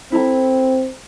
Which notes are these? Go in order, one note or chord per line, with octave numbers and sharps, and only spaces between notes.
C4 E4 A4 A#5